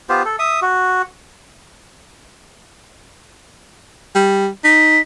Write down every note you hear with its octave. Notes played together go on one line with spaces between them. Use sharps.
B3 F4 G4 C5
A4
E5 D#6
F#4
G3
D#4 B6